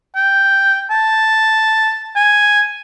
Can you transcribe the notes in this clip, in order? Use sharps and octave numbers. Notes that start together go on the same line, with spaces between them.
G5
A5
G#5